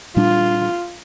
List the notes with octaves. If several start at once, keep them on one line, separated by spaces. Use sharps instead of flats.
A#2 G3 D4 F4